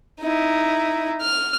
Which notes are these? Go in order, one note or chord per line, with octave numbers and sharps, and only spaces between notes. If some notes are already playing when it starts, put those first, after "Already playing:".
D#4 E4
F6